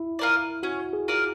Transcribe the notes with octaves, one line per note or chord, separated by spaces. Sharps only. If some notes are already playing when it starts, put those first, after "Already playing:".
Already playing: E4
F4 A#4 D5
C#4 F#4
G#4
F4 A#4 D5